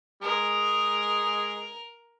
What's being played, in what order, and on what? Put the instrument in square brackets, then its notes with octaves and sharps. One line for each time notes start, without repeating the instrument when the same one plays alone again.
[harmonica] G#3 D#6 [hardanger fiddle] A#4